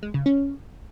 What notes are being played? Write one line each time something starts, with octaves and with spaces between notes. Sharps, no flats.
G#3
C#3
C#4